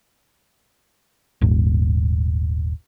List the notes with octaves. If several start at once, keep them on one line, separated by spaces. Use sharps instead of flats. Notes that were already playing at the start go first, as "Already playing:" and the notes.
D#1 G#1